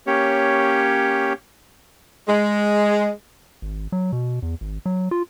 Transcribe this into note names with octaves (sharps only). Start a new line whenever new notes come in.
A#3 C#4 G4 C#5
G#3
G#1
F#3
B2
E2
G#1
F#3
F4